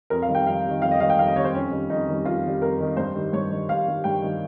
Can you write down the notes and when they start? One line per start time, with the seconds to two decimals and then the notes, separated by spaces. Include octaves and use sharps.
0.10 F2 A#4
0.22 F5
0.28 D#3 G3
0.35 G5
0.46 F2 F5
0.65 D#3 G3
0.82 F2 F5
0.91 D#5
1.00 D#3 G3 F5
1.10 G5
1.18 F2 F5
1.27 D#5
1.36 D#3 G3 C#5
1.45 C5
1.54 F2 C#4
1.71 D#3 G3
1.90 F2 D#4
2.08 D#3 G3
2.25 F2 F4
2.44 D#3 G3
2.61 F2 A#4
2.80 D#3 G3
2.97 G2 C5
3.15 D#3 G3
3.33 G2 C#5
3.51 D#3 G3
3.69 G2 F5
3.86 D#3 G3
4.04 G2 G5
4.22 D#3 G3